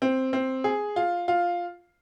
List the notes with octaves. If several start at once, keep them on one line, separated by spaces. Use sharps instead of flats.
C4
C4
G#4
F4
F4